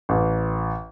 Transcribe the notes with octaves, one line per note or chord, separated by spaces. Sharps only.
A1